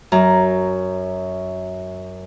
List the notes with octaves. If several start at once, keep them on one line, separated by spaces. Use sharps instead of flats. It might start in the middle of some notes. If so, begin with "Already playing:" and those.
F#2 A#5